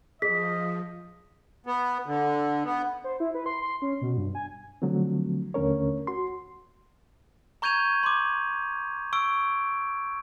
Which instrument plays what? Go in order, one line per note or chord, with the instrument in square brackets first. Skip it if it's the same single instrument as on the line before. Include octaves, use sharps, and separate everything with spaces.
[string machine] F3 [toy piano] G#4 [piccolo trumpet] D#5 [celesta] B6
[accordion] B3
D3
B3
[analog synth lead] C5
E4
B4
C6
C6
C#4
B2
G2
G#5
[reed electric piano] D3 F3 F#3 A3 C4
D#2 D3 A3 C#4 A#4 C#5
F#4 C6
[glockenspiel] A#5 C#6 G6 G#6 D#7 F7
C6 D6
C#6 E6 D7